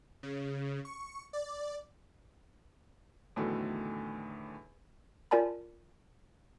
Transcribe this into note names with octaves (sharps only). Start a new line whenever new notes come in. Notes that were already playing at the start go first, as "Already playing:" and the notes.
C#3
C#6
D5
E2 A2 D3 D#3 F#3 A3
F4 A#4 D5 G#5 A5 B5